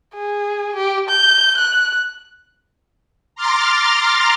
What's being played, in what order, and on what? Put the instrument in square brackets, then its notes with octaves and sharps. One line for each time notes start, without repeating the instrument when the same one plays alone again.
[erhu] G#4
G4
G6
F#6
[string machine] A#5 C6 D6 F6 A6